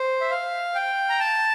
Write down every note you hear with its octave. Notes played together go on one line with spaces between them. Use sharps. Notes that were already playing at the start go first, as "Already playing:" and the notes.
Already playing: C5
E5
F5
G5
A#5
A5